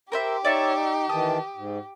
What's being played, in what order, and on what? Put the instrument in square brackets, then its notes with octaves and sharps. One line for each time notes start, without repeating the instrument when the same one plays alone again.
[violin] G4 [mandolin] A#4 C5 E5
[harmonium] D#4 C#5 [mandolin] D5 E5 C#6
[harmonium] D#4
[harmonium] D#3 E3 A5 [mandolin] D#6
[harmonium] G#2